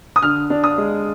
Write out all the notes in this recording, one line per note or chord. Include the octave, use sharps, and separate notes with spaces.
D#6
D3 F6
D4
D#6
G#3